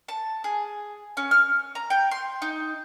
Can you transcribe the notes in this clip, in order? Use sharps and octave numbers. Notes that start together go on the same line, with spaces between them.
A5
G#4
C#4
F6
A#5
G5
C6
D#4